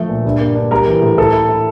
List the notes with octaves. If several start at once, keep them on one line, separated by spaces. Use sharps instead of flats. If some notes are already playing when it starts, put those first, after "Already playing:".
Already playing: F3 A3
A#2
G2
A#3
D4
G3 A#4 A#5
E3
A2
A2 A4 A5
E4
E4